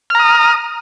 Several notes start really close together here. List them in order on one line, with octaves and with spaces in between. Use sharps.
F6 A#5 D#6